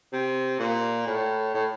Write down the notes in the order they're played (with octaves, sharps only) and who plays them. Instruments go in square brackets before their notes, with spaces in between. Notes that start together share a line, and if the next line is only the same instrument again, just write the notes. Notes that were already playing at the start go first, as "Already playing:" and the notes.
[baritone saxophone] C3
A#2
A2
A2